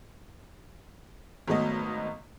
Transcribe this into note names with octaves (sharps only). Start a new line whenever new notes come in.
G#1 F#3 A3 B3 D#5